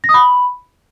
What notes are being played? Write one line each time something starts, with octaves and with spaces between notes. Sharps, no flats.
A#6
D#6
B5